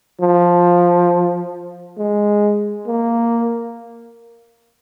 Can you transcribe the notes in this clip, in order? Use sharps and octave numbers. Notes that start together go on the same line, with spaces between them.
F3
G#3
A#3